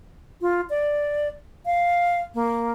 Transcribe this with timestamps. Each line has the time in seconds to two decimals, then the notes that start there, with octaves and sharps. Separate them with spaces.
0.41 F4
0.70 D5
1.66 F5
2.34 A#3